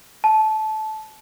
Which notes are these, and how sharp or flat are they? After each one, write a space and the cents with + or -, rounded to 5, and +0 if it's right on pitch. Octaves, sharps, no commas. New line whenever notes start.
A5 -20